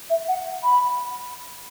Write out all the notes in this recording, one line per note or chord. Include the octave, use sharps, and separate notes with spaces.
E5
F#5
B5